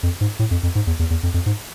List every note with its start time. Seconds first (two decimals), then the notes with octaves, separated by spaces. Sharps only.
0.03 F2
0.21 G#2
0.39 A2
0.51 F2
0.63 F2
0.75 G#2
0.87 E2
0.99 E2
1.10 E2
1.23 F2
1.34 F2
1.46 G#2